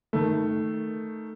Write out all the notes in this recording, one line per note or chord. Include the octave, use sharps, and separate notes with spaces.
D#3 A3